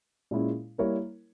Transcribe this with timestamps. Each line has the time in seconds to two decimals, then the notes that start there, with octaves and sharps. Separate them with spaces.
0.31 A#2 G#3 C#4 E4
0.78 G3 A#3 E4 A#4 C#5